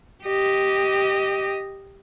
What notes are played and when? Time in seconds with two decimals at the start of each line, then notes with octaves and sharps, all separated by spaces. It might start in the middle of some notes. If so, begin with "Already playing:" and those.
0.24 G4 D#5